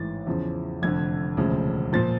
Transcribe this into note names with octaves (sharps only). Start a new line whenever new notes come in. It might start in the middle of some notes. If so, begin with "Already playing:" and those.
Already playing: A1 G#2 E3 A6
E2 C#3 F3
F1 F2 D3 G#6
E1 D2 C#3 F3
A#2 F3 A6